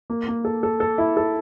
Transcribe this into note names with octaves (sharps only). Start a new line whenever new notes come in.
A#3
A#3
A4
A4
A4
E4
A4